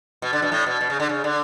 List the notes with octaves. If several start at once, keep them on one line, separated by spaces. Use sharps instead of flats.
B2
D3
B2
A2
B2
B2
C#3
D3
C#3
D3